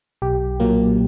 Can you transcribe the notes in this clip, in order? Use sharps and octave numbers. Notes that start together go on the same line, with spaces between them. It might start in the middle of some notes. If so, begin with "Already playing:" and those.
B1 G4
A#2 F#3 A#3